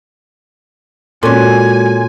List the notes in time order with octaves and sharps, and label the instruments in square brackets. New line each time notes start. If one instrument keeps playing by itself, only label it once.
[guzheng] A#2 C#4 [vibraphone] G#3 F#4 C6 [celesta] A4 [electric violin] G#5